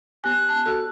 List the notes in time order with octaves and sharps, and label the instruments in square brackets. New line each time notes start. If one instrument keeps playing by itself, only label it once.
[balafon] B3 G4 G#5 [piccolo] F#6
[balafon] A5
F#4 A4